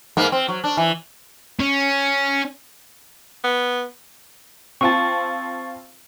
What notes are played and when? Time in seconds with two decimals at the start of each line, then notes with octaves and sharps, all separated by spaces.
0.17 G#2 A#3 B3
0.32 C4
0.48 F#3
0.64 D4
0.77 E3
1.60 C#4
3.44 B3
4.81 C4 F4 A5 C#6 A6